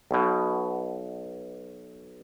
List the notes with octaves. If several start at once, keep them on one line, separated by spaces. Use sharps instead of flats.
B1 B2